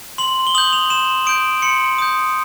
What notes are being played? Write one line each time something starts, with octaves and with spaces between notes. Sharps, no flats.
C6 F#7
G7
D#6 G6 F#7
F7
C6 E7
D#6 G6 D7
C6 C#7
D#6 G6